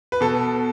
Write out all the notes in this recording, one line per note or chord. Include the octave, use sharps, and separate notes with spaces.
B4
B2 A4